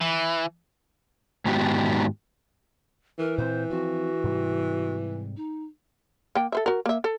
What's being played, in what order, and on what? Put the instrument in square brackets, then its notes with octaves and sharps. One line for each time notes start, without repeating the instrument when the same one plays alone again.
[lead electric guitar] E3
[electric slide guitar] G#2 D#3 G#3 B3 F#4 G4
[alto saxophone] E3 [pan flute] A#4
[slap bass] A#2 C4 [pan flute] C5
[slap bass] F3 C4 [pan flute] F#4
[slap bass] G#2 C3 G3
[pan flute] D#4
[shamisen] A#3 G5
A4 C5 E5
F#4 A#4
A#3 E5
A4